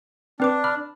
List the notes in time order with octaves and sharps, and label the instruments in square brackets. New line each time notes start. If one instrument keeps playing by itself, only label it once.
[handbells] C4 B4 D6 [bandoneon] D4
[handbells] B5 D6 F6